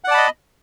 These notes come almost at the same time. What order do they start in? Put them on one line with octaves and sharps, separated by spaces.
F#5 D5 A5 B5 D#5